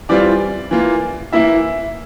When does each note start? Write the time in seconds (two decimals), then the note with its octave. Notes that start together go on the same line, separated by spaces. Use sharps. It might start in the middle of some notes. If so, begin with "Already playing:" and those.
0.09 E3 G3 C4 F4 D5
0.71 E3 A#3 F4
1.32 E3 A#3 E4 E5